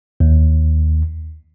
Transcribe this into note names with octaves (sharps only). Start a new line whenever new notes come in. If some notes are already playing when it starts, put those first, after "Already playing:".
D#2